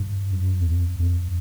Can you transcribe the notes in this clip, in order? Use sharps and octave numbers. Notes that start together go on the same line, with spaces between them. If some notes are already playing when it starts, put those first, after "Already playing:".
Already playing: G2
F#2
E2
F2
F2